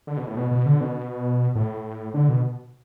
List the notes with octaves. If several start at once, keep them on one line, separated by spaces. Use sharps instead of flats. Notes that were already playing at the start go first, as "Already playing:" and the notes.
D3
B2
A2
B2
B2
D3
B2
A2
D3
B2